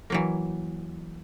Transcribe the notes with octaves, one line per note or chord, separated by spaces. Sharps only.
E3 F#3 A#3